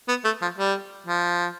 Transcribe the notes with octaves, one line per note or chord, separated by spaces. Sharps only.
B3
A3
F3
G3
F3